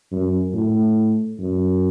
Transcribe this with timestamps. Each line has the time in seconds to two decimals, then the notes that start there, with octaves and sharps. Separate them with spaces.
0.12 F#2
0.54 A2
1.39 F#2